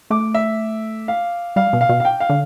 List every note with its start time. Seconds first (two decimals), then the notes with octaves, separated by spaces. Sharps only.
0.10 A3 D6
0.34 E5
1.08 F5
1.56 G3 F5
1.73 B2
1.81 F5
1.89 B2
2.00 F5
2.05 G5
2.20 F5
2.29 D3